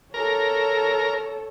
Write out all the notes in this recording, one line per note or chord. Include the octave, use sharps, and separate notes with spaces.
A4 A#4 C#5